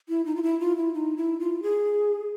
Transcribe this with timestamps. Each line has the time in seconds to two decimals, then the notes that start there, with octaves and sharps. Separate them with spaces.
0.09 E4
0.25 D#4
0.36 F4
0.43 E4
0.60 F4
0.77 E4
0.94 D#4
1.17 E4
1.40 F4
1.62 G#4